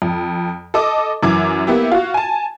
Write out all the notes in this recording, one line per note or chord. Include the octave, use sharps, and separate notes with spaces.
F2
A4 D#5 D6
F#2 E3 D6 G#6
A#3 B3 E4 G4
F4 F#4
G#5 A5